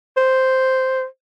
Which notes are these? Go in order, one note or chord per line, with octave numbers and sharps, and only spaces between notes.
C5